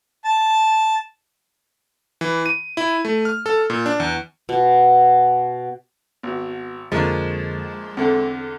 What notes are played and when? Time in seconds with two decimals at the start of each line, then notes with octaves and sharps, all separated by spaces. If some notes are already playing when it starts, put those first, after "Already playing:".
0.24 A5
2.21 E3
2.46 D#7
2.77 E4
3.05 A3
3.25 F6
3.46 A4
3.70 A#2
3.86 D4
4.00 E2
4.49 B2
6.23 G#1 B3 F#4
6.92 F2 D3 F3 G#3 A#3 D4 C#6
7.97 E2 D3 C4 A4